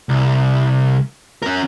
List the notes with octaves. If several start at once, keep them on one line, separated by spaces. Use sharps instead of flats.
C2
C#4 A#4